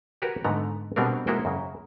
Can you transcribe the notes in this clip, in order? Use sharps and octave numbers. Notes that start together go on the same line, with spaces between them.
F#4 G4 A#4 B4 C#5
G#2 D3 A3 B3 A#5
B2 G3 B3 C4 D4 A#4
G#3 A#3 E4 F#4 C5 G5
F#2 C#3